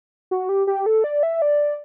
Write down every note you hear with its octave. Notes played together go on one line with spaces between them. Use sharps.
F#4
G4
G4
A4
D5
E5
D5